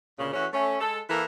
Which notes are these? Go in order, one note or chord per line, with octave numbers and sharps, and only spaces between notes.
D2 A#2 C#3
E3 A3 C#4 F#4
A3 C#4
G#3 A4
E3 A#3 E4 A4 A#4